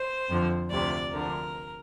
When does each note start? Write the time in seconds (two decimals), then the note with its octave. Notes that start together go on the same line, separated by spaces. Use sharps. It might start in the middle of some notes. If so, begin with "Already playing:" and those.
Already playing: C5
0.29 F2 D3 F3
0.70 D2 C3 F3 D5
1.13 D2 D3 F3 A#4